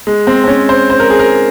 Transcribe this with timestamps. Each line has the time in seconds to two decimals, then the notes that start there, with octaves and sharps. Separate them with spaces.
0.07 G#3
0.27 C4
0.44 C4
0.48 C#4
0.69 C5
0.90 C5
1.00 A#4
1.10 G#4
1.19 A#4